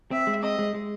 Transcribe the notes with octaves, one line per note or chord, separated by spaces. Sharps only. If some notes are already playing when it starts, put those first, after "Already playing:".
C4 E5
G#3
C4 D#5
G#3
G#3